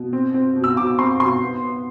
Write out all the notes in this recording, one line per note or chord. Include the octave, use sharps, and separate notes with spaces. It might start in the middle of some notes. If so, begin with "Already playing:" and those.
Already playing: B2
C4
C4
B2
E6
B2 D6
C4 C6
B2 C6
B3
B3